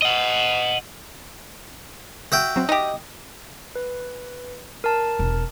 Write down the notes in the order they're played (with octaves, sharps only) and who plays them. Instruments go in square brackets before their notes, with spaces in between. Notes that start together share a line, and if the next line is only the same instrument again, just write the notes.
[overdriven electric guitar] D#5 F#5
[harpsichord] F#4 E5 G5
[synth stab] F#3 C4
[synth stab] D#4 [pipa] G4 D#5
[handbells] B4
A#4 A5
[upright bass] E1